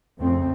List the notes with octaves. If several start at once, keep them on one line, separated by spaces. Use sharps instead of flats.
F2 C#3 A3 C4